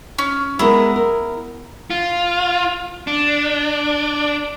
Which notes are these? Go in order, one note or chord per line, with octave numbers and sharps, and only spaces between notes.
C#4
G#3 B3 E4 A#4 D#6
A#4
F4
D4